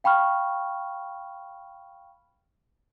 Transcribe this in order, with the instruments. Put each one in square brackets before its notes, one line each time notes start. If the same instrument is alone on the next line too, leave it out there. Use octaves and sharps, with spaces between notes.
[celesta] F5 G5 B5 C#6 F6